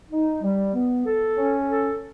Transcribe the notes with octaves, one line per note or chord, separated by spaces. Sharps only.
D#4
G3
B3
A4
C#4
A4